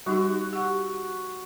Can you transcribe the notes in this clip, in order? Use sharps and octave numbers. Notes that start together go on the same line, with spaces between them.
G3 D#4 F#4 G4
G4 F#5